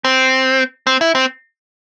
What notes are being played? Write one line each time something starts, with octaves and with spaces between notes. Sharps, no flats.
C4
C4
E4
C4